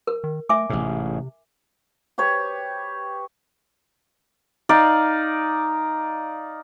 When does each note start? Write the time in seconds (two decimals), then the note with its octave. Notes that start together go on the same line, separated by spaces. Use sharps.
0.07 A#4
0.24 D#3
0.49 A3 E5 G#5 D6
0.70 A1 G#2 C3
2.18 G4 B4 C#5
4.69 D#4 D5 F5